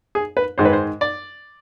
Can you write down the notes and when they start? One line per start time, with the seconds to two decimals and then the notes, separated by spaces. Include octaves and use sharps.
0.15 G#4
0.37 B4
0.58 G#2 D#3 G#3 C5
0.65 B4
0.73 C5
1.01 D5